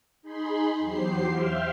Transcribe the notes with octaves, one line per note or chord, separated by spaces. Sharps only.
D#4 G#4 B5 C6
E2 F#3 G4 C5 C7
E5 F5 G5 C6 F6